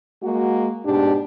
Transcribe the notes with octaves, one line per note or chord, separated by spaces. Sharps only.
G#3 A#3 F#4
G#2 B2 D4 G4